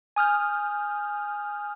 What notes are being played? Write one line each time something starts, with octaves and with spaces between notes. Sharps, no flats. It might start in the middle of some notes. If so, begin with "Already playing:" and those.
G#5 D#6 F6 G6